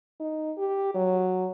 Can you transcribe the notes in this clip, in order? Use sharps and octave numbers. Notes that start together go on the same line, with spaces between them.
D#4
G4
F#3